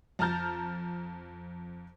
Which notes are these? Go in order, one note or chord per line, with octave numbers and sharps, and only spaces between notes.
F2 A5 A#5 F6 G6 A6